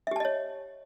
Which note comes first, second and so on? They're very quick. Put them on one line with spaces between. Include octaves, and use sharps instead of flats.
E5 G4 A5 D#5 C#5